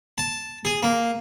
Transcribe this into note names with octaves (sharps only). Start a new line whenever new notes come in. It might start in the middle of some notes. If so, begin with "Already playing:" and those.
A5
G#4
A#3